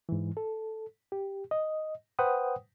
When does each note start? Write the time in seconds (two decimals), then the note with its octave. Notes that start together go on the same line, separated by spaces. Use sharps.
0.09 G#2 E3
0.37 A4
1.12 G4
1.51 D#5
2.19 B4 C5 F#5 G5 D#6